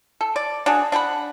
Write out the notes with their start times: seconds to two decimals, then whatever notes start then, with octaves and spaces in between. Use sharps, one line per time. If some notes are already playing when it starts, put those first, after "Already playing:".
0.21 A4
0.36 D5
0.66 D4 F#4 G#4
0.92 D4 F#5 G5 B5